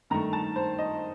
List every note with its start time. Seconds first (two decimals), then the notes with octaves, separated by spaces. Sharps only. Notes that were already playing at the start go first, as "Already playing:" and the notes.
0.10 G2 D#3 A3 A#5
0.33 A5
0.56 C5
0.79 D#5